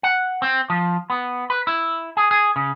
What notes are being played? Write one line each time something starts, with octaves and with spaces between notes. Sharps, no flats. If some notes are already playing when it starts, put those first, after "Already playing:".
F#5
C4
F3
B3
B4
E4
G#4
G#4
C#3